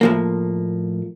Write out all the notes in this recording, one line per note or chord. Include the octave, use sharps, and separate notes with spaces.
A2 F3 A#3